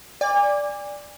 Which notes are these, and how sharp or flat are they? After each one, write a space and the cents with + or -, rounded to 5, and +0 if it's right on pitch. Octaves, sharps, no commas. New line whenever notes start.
D5 +0 G#5 -40